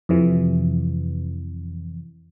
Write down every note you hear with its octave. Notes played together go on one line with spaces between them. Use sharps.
F2 C3 E3